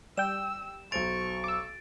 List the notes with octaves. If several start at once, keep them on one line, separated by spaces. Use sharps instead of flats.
G3 G5 E6 E7
B1 C5 C#6 A6 D7 F7
D6 E6